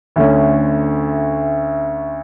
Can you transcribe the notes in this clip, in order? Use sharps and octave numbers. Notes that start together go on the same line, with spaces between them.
D2 D3 A3 C#4